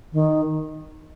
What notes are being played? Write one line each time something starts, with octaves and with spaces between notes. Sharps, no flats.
D#3